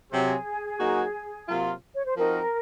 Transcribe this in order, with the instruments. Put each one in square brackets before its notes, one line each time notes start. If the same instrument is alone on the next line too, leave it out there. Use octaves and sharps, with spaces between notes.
[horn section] C3 F#3 C4 [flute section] G#4
[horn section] F#3 A#3 D#4 F#4
C3 F#3 A#3 F4
[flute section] C#5
C5
[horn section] F3 C4 D#4 F#4 [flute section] A#4